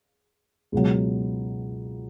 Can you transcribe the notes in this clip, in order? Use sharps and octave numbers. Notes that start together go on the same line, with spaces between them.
C#2 B2 F#3